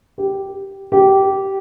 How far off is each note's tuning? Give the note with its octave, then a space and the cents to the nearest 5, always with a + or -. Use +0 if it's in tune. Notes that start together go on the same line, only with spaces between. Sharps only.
G4 -10
G4 -20